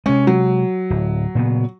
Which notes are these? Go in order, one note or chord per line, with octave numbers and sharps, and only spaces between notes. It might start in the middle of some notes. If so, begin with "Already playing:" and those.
C3 G#3 C#4
F#3
D1
A#2 C#3 B3